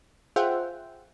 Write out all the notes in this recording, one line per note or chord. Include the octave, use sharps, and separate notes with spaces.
F4 G#4 C5 E5 F#5 G5